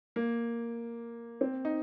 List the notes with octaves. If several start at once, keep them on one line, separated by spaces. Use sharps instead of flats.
A#3
C4
D#4